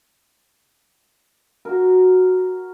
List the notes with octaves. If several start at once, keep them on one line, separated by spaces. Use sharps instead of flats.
F#4 A#4